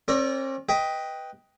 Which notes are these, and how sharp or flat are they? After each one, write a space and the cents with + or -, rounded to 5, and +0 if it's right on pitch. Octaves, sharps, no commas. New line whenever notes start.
C4 +45 A#4 +0 D5 -25
B4 +0 D#5 +15 G5 +0